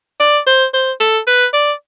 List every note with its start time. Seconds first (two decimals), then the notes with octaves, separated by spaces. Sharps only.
0.20 D5
0.47 C5
0.74 C5
1.00 A4
1.27 B4
1.53 D5